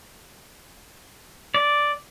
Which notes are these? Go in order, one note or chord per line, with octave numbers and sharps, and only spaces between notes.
D5